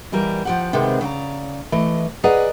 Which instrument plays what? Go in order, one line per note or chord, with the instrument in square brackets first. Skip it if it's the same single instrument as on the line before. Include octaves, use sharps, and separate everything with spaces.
[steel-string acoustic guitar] B2 E3 G3 A#4
F3 G4 F#5
C3 D#3 G#3 B3 C4
C#3 D5 F#5 A#5
E3 A3 D#5
G#4 B4 D5 D#5 F#5 A#5